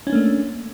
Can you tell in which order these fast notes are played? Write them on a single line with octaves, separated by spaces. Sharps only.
C#4 D4 A#3 A3